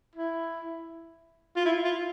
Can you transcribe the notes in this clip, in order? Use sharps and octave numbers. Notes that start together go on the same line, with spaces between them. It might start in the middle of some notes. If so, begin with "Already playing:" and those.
E4
F4
E4
F4